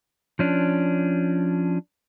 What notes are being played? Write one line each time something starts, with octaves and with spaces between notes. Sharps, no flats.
F3 C#4 D4